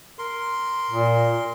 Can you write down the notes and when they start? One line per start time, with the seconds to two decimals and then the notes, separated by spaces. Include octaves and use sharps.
0.19 A#4 C6
0.91 A#2